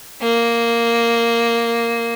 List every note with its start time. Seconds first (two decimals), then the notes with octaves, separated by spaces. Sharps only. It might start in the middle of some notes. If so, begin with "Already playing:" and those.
0.22 A#3